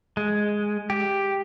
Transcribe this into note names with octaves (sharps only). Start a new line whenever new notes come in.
G#3
G4